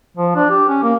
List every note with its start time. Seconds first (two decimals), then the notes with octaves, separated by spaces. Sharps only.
0.17 F3
0.35 D4
0.50 G4
0.69 C#4
0.83 A#3